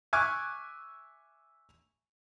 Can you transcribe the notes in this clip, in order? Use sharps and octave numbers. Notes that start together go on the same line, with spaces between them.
E5 G#5 C#6 D6 F6 F#6